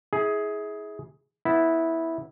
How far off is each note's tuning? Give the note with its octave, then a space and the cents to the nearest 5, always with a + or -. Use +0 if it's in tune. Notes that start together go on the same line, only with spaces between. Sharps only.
E4 -35 G#4 +10
B3 +0 E4 -10